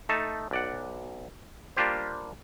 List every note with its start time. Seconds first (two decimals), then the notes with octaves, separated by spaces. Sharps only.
0.09 A3 D#4 A5
0.51 B1 D5 F#5
1.76 G3 A#3 D4 F4 G4 C5